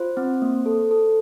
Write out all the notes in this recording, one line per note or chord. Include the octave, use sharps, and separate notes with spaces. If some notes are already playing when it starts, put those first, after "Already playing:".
Already playing: F4 C5
C4
A#3
A4
A4